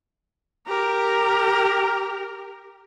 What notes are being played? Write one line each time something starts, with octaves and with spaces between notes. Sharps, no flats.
G4 A#4